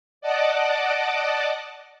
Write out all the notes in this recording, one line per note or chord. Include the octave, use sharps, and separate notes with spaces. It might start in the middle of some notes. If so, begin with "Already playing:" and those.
D5 D#5 F#5 A5 D6